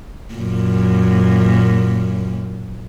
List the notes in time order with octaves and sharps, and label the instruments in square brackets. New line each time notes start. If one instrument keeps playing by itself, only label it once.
[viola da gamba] F#2 A#2